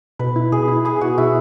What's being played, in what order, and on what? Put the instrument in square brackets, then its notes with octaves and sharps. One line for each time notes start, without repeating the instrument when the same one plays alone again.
[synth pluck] B2 [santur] B4
[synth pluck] E4
[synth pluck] B2 [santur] G#4
[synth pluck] E4
[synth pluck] E4 [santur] G#4
[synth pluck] B2 [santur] F#4
[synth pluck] B2 [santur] E4